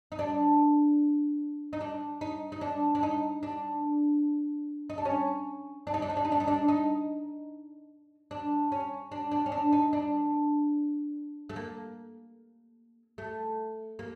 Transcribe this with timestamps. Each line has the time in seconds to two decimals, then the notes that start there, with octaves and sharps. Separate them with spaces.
0.12 D#4
0.19 D4
1.73 D#4
1.81 D4
2.21 D#4
2.52 D#4
2.61 D4
2.95 D4
3.03 D#4
3.43 D4
4.90 D#4
4.98 D4
5.05 C#4
5.87 D4
5.94 D#4
6.02 D4
6.10 D#4
6.17 D4
6.25 D#4
6.32 D4
6.40 D#4
6.48 D4
6.68 D#4
8.31 D4
8.72 C#4
9.11 D4
9.31 D4
9.46 C#4
9.52 D4
9.72 D#4
9.93 D4
11.49 A3
11.56 A#3
13.18 A3
13.99 A#3